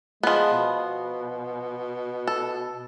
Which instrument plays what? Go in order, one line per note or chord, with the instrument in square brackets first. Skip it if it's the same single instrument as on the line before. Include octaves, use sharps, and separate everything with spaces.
[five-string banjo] F3 B3 [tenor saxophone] G#3
[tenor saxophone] B2
[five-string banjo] A4